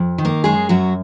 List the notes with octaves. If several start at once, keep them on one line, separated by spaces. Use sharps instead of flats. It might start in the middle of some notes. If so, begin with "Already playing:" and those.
Already playing: F2
D#3
A#3 A#4
F#2 G#3 G#4
F#2 F#3 F#4